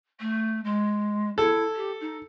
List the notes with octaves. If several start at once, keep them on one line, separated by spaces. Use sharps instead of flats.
A3
G#3
E4 A4
G4
D#4